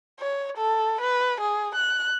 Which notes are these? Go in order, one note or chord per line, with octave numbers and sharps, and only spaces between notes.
C#5
A4
B4
G#4
F#6